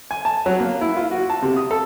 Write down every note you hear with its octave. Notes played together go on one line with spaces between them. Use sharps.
G#5
A5
F#3
A#3
E4
F4
F#4
A5
C3
D#6
A4